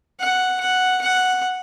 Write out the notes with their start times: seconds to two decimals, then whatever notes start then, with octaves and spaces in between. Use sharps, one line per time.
0.20 F#5
0.61 F#5
1.01 F#5